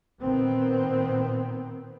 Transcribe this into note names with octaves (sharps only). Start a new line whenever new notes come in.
A#2 D#3 B3 C4